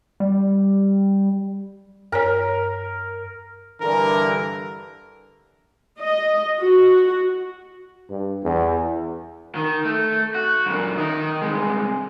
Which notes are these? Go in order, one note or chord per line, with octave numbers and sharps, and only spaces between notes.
G3
G2 A#4 C#5
G2 D3 E3 A#4
D#5
F#4
G2
E2
D#3
A3
F#4
F#2 A#2
D#3 D#5
C2 G#3